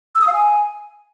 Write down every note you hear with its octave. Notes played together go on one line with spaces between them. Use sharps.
E6
D#6
F5
G#5